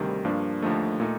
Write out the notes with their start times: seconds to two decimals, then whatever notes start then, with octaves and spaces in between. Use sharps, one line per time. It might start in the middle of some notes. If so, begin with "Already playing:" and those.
Already playing: D2 C3 D#3 G3
0.25 G2 F3 A#3 D4
0.62 D#2 D3 F3 A3 D#4
1.00 A#2 A3 D#4